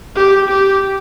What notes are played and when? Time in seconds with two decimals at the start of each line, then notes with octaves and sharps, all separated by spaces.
0.16 G4
0.50 G4